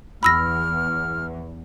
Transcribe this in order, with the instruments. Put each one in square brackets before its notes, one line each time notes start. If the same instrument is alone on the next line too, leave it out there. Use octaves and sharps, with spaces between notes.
[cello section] E2 [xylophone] B5 E6 A#6 [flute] F6